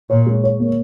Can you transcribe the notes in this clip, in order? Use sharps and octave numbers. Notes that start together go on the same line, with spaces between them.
A#2 C#5
G#3
C#5
A#3